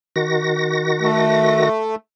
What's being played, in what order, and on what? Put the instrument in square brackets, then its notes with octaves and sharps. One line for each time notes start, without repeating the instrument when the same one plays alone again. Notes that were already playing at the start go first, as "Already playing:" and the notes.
[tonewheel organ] D#3 F#4 A#6
[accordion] A3